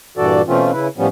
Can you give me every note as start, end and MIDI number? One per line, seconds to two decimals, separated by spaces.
0.17 0.42 43
0.17 0.42 46
0.17 0.42 52
0.17 0.42 66
0.17 0.42 69
0.17 0.42 74
0.47 0.72 47
0.47 0.72 52
0.47 0.72 57
0.47 0.72 60
0.47 0.72 61
0.47 0.72 65
0.72 0.88 49
0.72 0.88 64
0.72 0.88 71
0.98 1.08 45
0.98 1.08 53
0.98 1.08 55
0.98 1.08 59
0.98 1.08 61